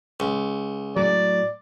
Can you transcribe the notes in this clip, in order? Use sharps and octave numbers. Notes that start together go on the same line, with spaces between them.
C#2
A2 F#3 D5